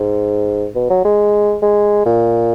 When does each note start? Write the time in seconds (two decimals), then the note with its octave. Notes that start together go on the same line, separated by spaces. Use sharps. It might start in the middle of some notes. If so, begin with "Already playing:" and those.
Already playing: G#2
0.75 B2
0.90 F#3
1.05 G#3
1.62 G#3
2.06 A#2